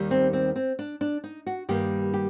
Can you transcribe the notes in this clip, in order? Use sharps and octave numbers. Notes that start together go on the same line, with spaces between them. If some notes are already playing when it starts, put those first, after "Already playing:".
Already playing: D#2 D#3 G3
C4
C4
C4
D4
D4
D#4
F#4
G2 D#3 G3 A#3 G4
G4